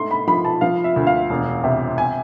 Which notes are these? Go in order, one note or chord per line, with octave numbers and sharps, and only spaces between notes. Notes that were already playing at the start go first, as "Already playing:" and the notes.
Already playing: G#2 A3 C6
B5
F3 B5
A5
F3 F5
E5
D2
F5
E1
C3
G#5